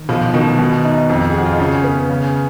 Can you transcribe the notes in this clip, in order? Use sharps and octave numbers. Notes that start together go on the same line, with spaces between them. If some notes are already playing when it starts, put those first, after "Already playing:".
Already playing: D#3
B1 F3
B2 D#3
B2 D#3
D#4
F2
G#4
F3 F#4
F4
D#4
C#3 C#4
B3
C#3